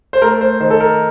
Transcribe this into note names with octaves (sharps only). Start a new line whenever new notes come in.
C5
A3 A#4
C5
D#3 C5
A4
A#4